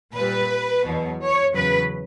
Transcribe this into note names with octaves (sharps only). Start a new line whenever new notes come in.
A#2 G3 B4
E2 B2 F#3
C#5
E2 C#3 F#3 B4